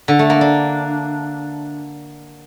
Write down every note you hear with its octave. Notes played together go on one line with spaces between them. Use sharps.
D3
A3
A#3
D4